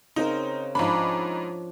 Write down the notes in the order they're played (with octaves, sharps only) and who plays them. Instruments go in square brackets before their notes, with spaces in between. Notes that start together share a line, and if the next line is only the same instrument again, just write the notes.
[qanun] C#3 C4 A#4 [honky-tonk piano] D#4
[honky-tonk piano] G#2 B5 [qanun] F3 C#4 D4